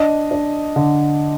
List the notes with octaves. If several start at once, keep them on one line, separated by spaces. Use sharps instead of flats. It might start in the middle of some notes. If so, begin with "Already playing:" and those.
Already playing: D4 D#5
D4
D3